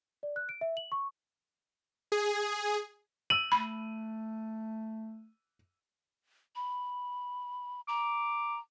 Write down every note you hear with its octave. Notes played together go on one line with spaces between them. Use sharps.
D5
F#6
D7
E5
F#7
C#6
G#4
E6 D#7 F#7
A3 B5
B5
A#5 D6